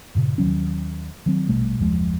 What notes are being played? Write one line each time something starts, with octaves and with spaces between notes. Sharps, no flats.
G2 A#2 C#3
D#2 D#3 F#3 C#4
D#3 F#3 C4
A#1 B2 G3 A3
F#1 D#2 F3 G#3